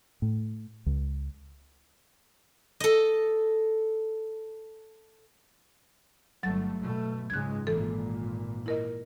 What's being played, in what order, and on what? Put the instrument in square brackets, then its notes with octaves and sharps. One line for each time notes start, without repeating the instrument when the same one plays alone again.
[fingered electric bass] A2
C#2
[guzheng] A4 D#5
[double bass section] G1 A3 [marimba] F#3 A6
[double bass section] B2 A3
[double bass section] C#2 G#2 G#3 [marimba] F#6 G#6
[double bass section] G#1 A#2 [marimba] E3 A4
[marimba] E4 A#4 D#5